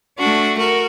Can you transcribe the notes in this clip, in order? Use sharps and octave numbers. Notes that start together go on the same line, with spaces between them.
A3 D4 F#4
F#4 A#4